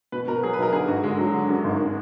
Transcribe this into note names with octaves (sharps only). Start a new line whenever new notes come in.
B2 B4
B2 A#4
F#3 G#4
B4
B1 A#4
D3 G#4
G#1 F#4
D3 G#3
F#3
D3
F#2
G#1